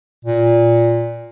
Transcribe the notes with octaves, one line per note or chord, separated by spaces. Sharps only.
A#2